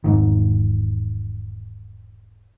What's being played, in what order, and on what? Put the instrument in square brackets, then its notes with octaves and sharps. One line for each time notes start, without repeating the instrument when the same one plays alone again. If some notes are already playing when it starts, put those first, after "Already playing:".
[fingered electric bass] E1 G#2 D#3